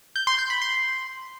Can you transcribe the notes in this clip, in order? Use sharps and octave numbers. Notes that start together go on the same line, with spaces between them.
G6
C6
G6
B5
C6